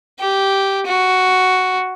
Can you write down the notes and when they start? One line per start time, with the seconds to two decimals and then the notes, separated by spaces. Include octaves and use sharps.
0.20 G4
0.86 F#4